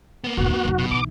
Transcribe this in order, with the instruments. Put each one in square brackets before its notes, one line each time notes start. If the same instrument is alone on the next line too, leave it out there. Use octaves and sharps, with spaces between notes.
[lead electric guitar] A#3 B3
[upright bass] F1 G#2 [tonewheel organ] F#4
[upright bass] F2
F1 F#2
[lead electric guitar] B2
[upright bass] B1 E3 [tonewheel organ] D6